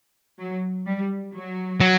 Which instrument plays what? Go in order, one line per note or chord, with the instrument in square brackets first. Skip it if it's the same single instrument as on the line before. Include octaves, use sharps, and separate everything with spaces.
[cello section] F#3
G3
F#3
[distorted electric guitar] F#3